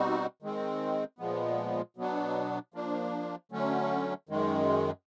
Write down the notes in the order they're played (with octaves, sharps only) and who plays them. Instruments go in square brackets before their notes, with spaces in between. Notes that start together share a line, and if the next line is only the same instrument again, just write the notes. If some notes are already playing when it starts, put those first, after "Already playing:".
Already playing: [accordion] B2 G3 C4 D#4 F#4
D#3 G#3 C4
A#2 F3 G#3 B3
B2 F#3 B3 D4
F3 A#3 D4
D3 F#3 A3 C#4
F#2 D#3 G#3